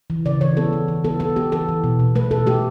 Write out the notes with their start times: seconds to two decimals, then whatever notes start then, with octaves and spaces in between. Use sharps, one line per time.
0.10 E3
0.25 C#3 D5
0.41 E3 C#5
0.57 B3 A4
0.73 E3
0.88 E3
1.04 B3 A4
1.20 B3 A4
1.36 B3 G4
1.52 E3 A4
1.69 E3
1.84 B2
1.99 B2
2.15 A3 B4
2.31 B2 A4
2.47 A3 G4